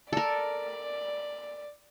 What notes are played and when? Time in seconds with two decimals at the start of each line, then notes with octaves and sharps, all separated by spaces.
0.13 A4 A#4 D5